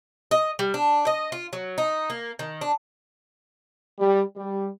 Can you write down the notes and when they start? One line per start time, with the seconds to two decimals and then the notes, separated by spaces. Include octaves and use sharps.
0.31 D#5
0.59 G3
0.74 D4
1.07 D#5
1.32 F4
1.53 F#3
1.78 D#4
2.10 A#3
2.39 D#3
2.61 D4
3.99 G3
4.37 G3